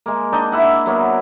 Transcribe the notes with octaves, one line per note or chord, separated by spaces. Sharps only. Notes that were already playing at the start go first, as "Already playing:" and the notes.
G#3 A#3
D4 D#4 G5
E4 E5 F#5
F#3 A#3 B3